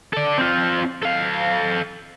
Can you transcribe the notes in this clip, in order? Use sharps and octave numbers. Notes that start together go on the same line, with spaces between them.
A4 D5
C4 F4
A4 F5